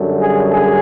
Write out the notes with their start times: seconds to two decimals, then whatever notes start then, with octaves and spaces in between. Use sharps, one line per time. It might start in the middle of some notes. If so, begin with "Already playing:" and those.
Already playing: F#2 D3 G3
0.19 G#4
0.48 G#4